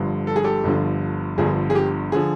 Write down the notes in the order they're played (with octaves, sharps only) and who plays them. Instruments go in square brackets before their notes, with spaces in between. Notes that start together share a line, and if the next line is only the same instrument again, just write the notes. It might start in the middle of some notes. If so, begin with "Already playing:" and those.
Already playing: [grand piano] G1 G2 D3 F3
A4
G#4
G4 A4
G1 G2 D3 F3
G1 G2 D3 F3 G#4
G#4
G4
D3 F3 G#4